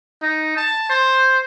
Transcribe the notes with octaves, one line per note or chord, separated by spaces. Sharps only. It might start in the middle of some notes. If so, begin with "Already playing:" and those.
D#4
A5
C5